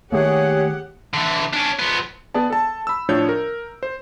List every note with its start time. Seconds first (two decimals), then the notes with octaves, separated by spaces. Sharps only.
0.12 D#3 A3 A#3 G4 G#4 C#5 F#5
1.14 D3 E3
1.53 C#4 D4
1.79 F3 B3
2.34 B3 G#4 D5 A5
2.50 A4 A5
2.87 B5 E6
3.09 A2 F3 D4 C#5 G6
3.29 A#4
3.83 C5